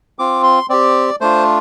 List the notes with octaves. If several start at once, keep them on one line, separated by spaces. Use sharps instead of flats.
C4 F4 D6
C6
C4 G4 D5
A3 D4 F4 C5